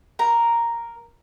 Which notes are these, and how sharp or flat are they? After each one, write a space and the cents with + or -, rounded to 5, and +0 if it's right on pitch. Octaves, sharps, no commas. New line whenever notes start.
A#4 +0 A#5 +0